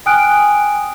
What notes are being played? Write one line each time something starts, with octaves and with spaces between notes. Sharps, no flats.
G5 G#5 D#6 F6 F#6 D7